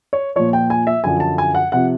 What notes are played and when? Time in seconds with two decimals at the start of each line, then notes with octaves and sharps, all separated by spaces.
0.13 C#5
0.36 A#2 F3 C#5
0.53 G5
0.70 G#5
0.87 E5
1.04 F#2 D3 F3 G#5
1.20 A5
1.38 G#5
1.55 F#5
1.72 C3 F3 F#5